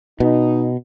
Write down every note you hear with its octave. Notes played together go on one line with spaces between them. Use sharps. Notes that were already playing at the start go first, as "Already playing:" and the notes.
B2 D#4